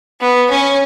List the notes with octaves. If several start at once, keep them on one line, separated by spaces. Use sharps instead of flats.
B3
C#4